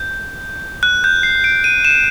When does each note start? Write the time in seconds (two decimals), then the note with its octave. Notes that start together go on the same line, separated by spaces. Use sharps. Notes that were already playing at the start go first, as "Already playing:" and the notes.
Already playing: G6
0.83 F#6
1.04 G6
1.23 C7
1.44 D7
1.64 D#7
1.85 E7